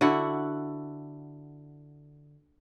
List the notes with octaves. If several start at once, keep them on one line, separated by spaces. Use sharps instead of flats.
D3 E4 F#4 F#5